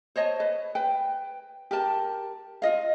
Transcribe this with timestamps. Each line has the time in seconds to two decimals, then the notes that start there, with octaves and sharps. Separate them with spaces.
0.16 C5 C#5 D#5 A5
0.40 B4
0.75 B4 G5
1.71 G4 A#4 A5
2.62 F4 D#5 F5